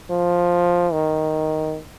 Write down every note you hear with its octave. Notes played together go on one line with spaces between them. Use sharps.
F3
D#3